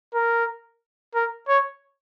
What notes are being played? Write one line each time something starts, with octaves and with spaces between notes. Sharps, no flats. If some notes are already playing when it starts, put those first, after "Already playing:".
A#4
A#4
C#5